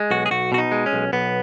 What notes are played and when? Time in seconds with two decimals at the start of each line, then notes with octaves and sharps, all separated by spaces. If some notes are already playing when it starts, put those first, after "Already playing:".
Already playing: G#3
0.11 B1 F#4
0.26 G#4
0.31 B1 F#4
0.52 B2 F#4
0.58 D#4
0.72 G#3
0.86 C#4
0.93 B1
1.13 B1 B3